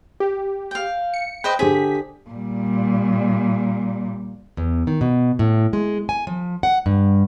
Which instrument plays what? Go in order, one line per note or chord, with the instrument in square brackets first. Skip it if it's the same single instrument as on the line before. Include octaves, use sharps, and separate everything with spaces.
[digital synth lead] G4
[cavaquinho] F5 G5
[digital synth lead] C#7
[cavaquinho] B4 C5 D#5 [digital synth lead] G5
[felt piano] D3 G4 C5 [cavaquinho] G#4 [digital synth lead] B6
[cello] A#2 G3
[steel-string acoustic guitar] E2
D#3
B2
A2
G#3
G#5
F3
F#5
G2